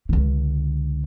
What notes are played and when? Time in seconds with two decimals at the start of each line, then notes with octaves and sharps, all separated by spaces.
0.09 C#2 D3